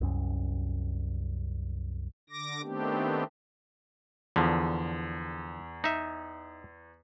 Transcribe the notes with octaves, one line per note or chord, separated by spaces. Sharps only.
C2 F#2 C#4
D3 D6 A#6
D#3 A3 B3 C4 D4 G4
E2 D3 F3
D#4 E5